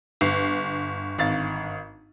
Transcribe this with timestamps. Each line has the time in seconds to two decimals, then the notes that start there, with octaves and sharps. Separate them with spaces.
0.21 G1 C7
1.18 G#1 F5 A6